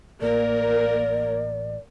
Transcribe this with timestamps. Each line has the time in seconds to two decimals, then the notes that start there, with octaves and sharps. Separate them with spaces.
0.22 A1 A#3 A#4 D5